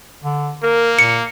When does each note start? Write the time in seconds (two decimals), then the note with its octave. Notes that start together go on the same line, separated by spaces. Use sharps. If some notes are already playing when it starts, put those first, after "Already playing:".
0.23 D3
0.63 A#3 A#4
0.99 A#2 C#7